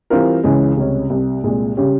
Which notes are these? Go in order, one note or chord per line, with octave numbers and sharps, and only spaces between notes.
E3 G3 C4 F4 A#4
C#2 C#3 E3 G#3 C#4
C#2 C3 G3 C#4
C2 C3 G3
C2 A#2 G#3
C#3 G3 C#4 G4